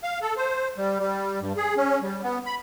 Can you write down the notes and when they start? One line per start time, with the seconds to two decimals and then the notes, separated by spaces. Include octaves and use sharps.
0.03 F5
0.22 A4
0.37 C5
0.78 G3
1.00 G3
1.41 G2
1.57 G#4
1.77 C#4
2.02 G3
2.23 B3
2.46 B5